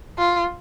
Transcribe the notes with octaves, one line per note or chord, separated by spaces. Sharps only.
F4